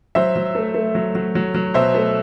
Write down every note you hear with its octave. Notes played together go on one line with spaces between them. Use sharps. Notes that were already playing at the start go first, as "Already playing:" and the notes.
F#3 C5 E5
F#3
A3
A3
F#3
F#3
F#3
F#3
B2 C5 E5
A3